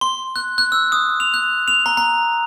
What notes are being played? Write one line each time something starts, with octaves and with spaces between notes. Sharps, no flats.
C6
F#6
F#6
E6
D#6
F7
F#6
F7
A#5
A#5